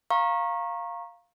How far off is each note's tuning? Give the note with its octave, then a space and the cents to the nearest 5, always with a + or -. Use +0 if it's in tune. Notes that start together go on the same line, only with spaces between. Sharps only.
F5 +0 A#5 +5 C#6 -25